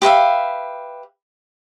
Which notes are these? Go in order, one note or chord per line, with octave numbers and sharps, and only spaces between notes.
G4 B4 E5 F5